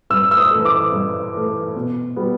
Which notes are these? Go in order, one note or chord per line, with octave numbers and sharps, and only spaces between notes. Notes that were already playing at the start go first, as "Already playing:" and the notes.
G2 E6
E6
D#6
E3 A3
D6
G2
E3 A3
B2
G3 B3